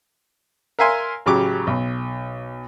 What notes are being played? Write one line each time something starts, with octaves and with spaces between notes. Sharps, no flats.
A#4 E5 F5 G#5 C6
A1 C#3 F#3 G4 C#6 D6
B1